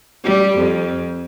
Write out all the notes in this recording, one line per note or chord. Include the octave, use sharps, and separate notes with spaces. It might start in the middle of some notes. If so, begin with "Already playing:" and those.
G3
F2